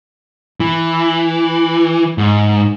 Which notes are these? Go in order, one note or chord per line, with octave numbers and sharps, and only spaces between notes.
E3
G#2